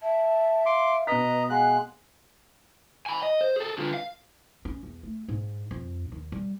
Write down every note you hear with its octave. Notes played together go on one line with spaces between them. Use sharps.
E5 A5
F5 C6 D6
B2 B4 D#5 A#5 B6
G#3 F5 F#5 F#6
G#5 B5
D#5
C5
G#4 A4
D3 F4
F5
C#4
E2
A3
G#2
F2
D#2
G3